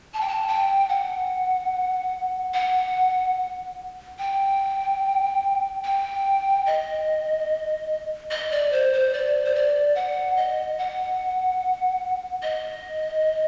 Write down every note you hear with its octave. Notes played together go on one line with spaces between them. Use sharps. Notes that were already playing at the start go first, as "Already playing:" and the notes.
A5
G5
A5
G5
F#5
F#5
G5
G5
D#5
D#5
D5
C5
C5
D5
C5
D5
F#5
D#5
F#5
D#5